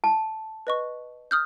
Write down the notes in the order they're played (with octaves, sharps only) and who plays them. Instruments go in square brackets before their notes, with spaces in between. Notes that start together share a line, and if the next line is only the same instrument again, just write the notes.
[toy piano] A5
[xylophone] B4 D#5 C#6
D#6 F6 G6